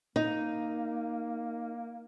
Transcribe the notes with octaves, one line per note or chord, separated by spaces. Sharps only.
A#3 D#4